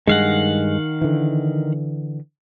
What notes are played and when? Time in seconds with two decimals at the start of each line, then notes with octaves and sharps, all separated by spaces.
0.08 G2 D#3 G#3 F5 F#5
1.01 D3 E3